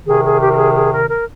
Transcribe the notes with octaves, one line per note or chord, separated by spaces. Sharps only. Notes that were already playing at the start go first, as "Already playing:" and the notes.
C2 C3 D#3 G#4
G#4
G4
A#4
G#4
G#4
A#4
A#4